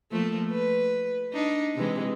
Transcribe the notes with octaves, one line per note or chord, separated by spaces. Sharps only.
F3 A3 A#3
B4
D4 D#4
C3 E3 G#3